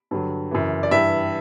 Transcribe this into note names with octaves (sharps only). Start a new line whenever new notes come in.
G2 D3 F#3
F#2 C#3 E3
D5
G2 E3 G3 E5